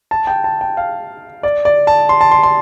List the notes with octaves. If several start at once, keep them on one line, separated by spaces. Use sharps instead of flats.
A5
G5
A5
G5
F5
D5
D5
A5
C6
A5
C6
C6